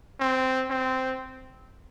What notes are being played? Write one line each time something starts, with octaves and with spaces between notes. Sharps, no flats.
C4
C4